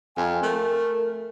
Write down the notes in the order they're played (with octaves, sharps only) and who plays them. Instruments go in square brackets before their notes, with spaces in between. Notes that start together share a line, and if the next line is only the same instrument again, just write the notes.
[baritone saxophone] F2 [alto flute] G#5
[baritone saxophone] A3 [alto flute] A#4